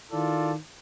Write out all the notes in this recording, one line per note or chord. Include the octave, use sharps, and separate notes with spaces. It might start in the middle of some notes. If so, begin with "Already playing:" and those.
D#3 E4 F4 A4 D5